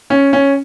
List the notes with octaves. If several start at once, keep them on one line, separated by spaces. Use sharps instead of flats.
C#4
C#4